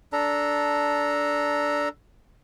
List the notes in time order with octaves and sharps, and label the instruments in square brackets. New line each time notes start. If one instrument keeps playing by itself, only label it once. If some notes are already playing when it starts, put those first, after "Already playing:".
[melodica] D4 A4 A#5